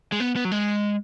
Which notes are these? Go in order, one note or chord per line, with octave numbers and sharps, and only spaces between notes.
G#3
B3
B3
F#3
G#3